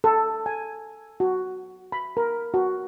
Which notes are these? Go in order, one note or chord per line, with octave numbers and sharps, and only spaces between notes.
A4
G#5
F#4
B5
A#4
F#4